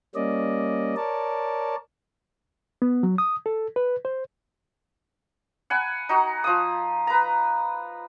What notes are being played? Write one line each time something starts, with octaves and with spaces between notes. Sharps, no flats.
G3 A#3 C#4 D5 D#5
A#4 C#5 D5 A5
B3
F#3
D#6
A4
B4
C5
F#5 G#5 B5
D#4 F#4
F3 D#6
B4 A#5